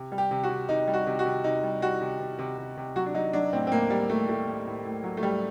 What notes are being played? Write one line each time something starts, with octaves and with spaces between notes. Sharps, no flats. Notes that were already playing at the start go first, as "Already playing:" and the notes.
Already playing: C3
G3
G4
C3
F#4
C3
C3 D#4
G3
F#4
C3
F#4
C3
C3 D#4
G3
G3 F#4
C3
C3
C3
C3
C3
F#3 F#4
D4
F#3 D#4
F#3 D4
A2 C4
C4
A2 A#3
A2 G3
A2 A3
A2 A3
A2
A2
A2
F#3
A3
A2 G3